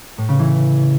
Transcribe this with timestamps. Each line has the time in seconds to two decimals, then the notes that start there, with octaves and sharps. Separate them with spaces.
0.18 A2
0.29 C#3
0.39 E3